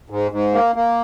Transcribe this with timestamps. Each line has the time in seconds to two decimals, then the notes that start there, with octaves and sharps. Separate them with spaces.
0.10 G#2
0.31 G#2
0.53 A#3
0.75 A#3